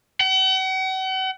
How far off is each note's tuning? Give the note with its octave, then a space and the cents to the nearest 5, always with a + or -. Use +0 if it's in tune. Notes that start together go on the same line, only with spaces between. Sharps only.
F#5 +40